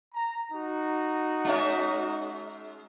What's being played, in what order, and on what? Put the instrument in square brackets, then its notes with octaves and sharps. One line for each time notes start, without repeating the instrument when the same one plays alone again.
[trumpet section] A#5
D#4 F#4
[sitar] G#3 C#4 E5